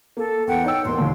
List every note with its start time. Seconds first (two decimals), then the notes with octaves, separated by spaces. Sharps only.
0.17 A#3 A4
0.47 E2 F#5 G5
0.64 D#4 C#5 G5 E6
0.85 E1 A#3 C6
0.99 D#2 A#2